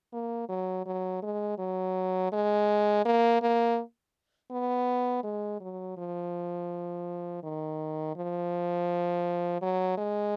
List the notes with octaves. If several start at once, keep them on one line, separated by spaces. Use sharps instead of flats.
A#3
F#3
F#3
G#3
F#3
G#3
A#3
A#3
B3
G#3
F#3
F3
D#3
F3
F#3
G#3